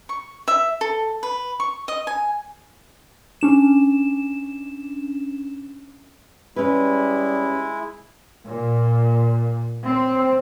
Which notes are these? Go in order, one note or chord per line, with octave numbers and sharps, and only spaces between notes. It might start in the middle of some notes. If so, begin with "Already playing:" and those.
C#6
E5
A4
B4
C#6
D#5
G#5
C#4 D4 E7
G3 G#3 C#4 E4 B4
A#2
C4